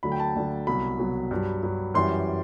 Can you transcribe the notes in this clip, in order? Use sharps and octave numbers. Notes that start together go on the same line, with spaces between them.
D2 D3 F#3 B5
G5
A5
D2 D3 F#3
C2 B2 F#3 B5
C2 B2 F#3
G2 F#3
G2 F#3
F#2 E3 G3 C6